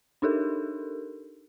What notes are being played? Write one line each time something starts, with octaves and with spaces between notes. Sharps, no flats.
D4 D#4 G4 A4 A#4